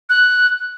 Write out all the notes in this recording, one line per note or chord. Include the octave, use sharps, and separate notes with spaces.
F#6